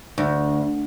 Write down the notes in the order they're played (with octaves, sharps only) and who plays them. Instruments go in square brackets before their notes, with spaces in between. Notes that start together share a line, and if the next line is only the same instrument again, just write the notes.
[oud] D2